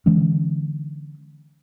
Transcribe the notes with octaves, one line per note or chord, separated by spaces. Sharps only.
D3 E3 G#3 C#4